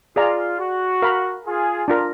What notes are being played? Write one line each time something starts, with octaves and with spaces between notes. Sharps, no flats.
F4 G#4 D5 F5 A#5
F#4
A#4 F5 B5
F4 G#4
D4 F4 A#4